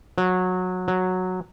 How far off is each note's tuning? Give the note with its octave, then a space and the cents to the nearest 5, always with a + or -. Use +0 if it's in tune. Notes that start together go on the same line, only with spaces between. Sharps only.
F#3 -20
F#3 -10